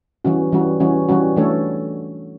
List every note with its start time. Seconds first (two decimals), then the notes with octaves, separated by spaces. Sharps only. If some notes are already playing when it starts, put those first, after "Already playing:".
0.25 E3 G3 C#4 F#4
0.52 E3 G3 C#4 F#4
0.80 E3 G3 C#4 F#4
1.09 E3 G3 C#4 F#4
1.36 E3 A3 D4 A4 C#5